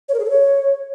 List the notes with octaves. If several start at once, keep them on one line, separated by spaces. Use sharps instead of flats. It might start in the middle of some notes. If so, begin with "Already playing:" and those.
C#5
A#4
G#4
A4
C#5